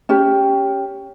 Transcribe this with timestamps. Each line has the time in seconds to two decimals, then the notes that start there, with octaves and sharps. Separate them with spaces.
0.09 C#4 G4